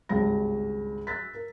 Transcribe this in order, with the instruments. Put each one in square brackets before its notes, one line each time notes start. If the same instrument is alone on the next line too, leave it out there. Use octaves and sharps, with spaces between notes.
[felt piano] G#1 C#2 G2 A5 A#6
E6 F#6 A6 B6
A#4